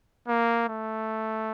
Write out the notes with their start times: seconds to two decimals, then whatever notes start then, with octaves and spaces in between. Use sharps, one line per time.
0.28 A#3
0.69 A3